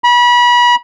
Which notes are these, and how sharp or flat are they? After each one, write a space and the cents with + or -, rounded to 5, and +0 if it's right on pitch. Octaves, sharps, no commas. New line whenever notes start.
B5 -30